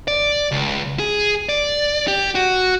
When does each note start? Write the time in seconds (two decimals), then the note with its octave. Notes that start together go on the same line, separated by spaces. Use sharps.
0.08 D5
0.51 C#2
0.99 G#4
1.49 D5
2.08 G4
2.35 F#4